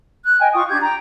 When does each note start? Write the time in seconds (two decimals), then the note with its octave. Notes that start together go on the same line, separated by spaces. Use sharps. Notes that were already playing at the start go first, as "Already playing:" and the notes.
0.24 F#6
0.40 D#5 G5 G#5
0.53 F4 C#6 D#6
0.69 D4 G4 G6 G#6
0.82 G5 A#5